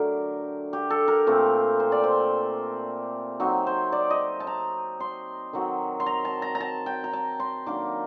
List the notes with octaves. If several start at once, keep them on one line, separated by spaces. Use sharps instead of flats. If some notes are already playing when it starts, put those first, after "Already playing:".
Already playing: D3 F#3 A3 D4 G4 A#4
G4
A4
A#4
A#2 A3 C4
C5
D5
C5
F#3 C4 D#4
C5
D5
D#5
A5
A#5
C6
D#3 F#3 C4
C6
A#5
A5
A#5
A#5
A5
G5
A#5
A5
C6
D#3 F#3 A#3 D4 D6